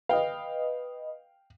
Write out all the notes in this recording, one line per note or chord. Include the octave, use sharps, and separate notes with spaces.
B4 D#5 F5 G5